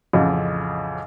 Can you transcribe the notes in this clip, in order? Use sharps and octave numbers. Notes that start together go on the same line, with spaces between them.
A1 F2 C#3